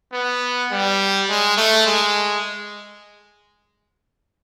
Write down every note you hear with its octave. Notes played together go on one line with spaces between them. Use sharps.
B3
G3
G#3
A3
G#3